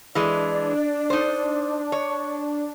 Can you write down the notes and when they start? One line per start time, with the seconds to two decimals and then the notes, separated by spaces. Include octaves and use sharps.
0.15 E3 G#3 D4 D5
1.10 D#4 C5
1.92 C#5